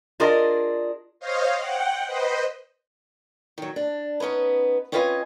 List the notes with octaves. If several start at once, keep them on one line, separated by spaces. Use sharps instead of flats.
D4 F4 G#4 A#4 D5 D#5
C5 C#5 D#5 F5
F#5 G5
B4 C5 D#5
D#3 F#3
D4
B3 C#4 D#4 B4
C4 C#4 F4 B4 D#5 G#5